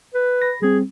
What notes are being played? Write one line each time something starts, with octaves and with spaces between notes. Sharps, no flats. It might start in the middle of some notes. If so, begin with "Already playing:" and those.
B4
B5 A#6
G3 C4 G#4